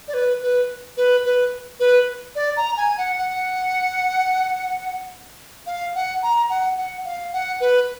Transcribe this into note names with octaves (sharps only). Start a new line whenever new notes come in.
D5
B4
B4
B4
B4
B4
D5
A#5
G#5
F#5
F#5
F5
F#5
A#5
F#5
F#5
F5
F#5
B4